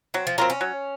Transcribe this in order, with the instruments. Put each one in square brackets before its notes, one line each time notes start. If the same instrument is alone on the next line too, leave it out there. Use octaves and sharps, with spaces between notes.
[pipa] F#3 [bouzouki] C4
[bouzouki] F3
[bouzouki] F#3 [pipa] C4 F4 A#4
[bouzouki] C#4
[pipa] F#3